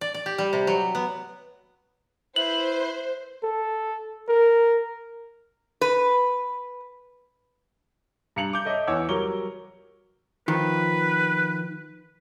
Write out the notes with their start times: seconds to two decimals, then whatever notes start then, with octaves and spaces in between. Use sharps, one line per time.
0.01 D5
0.14 D5
0.26 G4
0.38 G3
0.53 C3
0.67 F#3
0.95 B3
2.36 E4 B4 C5 F#7
3.43 A4
4.28 A#4
5.81 B4
8.36 G2 A#5 C#7 F7 F#7
8.53 D6 G6
8.65 A4 C#5 D#5 E5
8.87 E2 C#5 F#5 G#5 D6 E6
9.09 F#3 G3 A#4 C#6 D6 G7
10.48 D#3 F3 B4